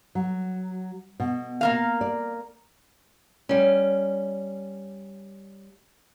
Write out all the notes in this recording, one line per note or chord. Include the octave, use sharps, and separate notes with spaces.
F#3
B2
A#3 A#4 F5
D5
G3 C#4